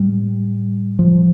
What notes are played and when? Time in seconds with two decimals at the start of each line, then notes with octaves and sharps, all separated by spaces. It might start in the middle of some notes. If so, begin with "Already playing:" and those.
Already playing: A2 G3
0.99 F3